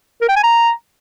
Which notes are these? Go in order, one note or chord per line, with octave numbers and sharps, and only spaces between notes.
A#4
G5
G#5
A#5